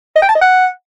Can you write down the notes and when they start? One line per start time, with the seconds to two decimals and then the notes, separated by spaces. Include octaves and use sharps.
0.16 D#5
0.22 G5
0.28 A5
0.35 D#5
0.41 F#5